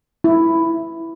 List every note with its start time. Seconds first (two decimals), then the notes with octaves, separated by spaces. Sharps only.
0.24 E4